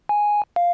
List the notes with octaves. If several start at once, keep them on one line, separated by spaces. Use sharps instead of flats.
G#5
F5